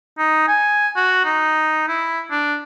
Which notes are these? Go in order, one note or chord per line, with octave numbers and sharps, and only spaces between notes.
D#4
G#5
F#4
D#4
E4
D4